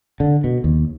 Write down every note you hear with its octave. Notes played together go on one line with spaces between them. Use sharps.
D3
B2
D#2